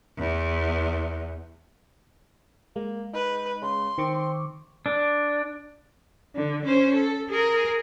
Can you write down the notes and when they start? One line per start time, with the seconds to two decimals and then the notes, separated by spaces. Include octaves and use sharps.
0.18 E2
2.76 G#3 A#3
3.14 D#4 B4
3.62 C#3 C6
3.98 D#3 C4 C#6 D6
4.86 D4
6.36 D3
6.65 C#4 C5
6.95 A4
7.30 G#4 A#4